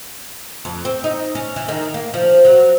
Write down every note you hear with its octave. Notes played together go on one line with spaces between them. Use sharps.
F2
C4
D#4
C#4
E3
D#3
A#3
F3
F#3